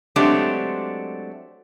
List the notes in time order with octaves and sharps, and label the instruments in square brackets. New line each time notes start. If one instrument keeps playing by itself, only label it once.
[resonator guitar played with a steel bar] F#3 G#3 A3 C4 D4 G4